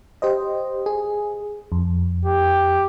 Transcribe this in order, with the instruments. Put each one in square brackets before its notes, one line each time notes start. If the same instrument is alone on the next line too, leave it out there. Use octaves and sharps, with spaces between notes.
[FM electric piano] G4 C5 D#5
G#4
F2
[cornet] G4